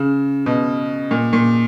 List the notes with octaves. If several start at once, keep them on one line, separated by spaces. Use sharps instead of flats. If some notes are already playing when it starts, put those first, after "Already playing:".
Already playing: C#3
B2
A#2
A#2